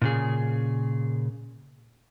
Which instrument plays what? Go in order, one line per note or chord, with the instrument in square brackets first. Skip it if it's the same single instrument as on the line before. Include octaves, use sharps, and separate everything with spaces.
[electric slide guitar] A#2 C#3 G#4